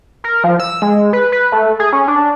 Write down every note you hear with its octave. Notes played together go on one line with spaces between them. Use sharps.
A#4
F3
E6
G#3
B4
B4
A3
G#4
C#4
D4